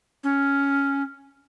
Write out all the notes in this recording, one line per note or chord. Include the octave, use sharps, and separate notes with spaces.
C#4